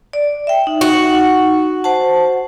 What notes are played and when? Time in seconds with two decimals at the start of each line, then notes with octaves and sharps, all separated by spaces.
0.13 D5
0.47 E5 G5
0.67 D#4
0.81 F#4
1.84 C5 F#5 A5